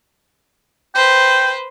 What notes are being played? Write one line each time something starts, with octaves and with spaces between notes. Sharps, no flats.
B4 C5 G5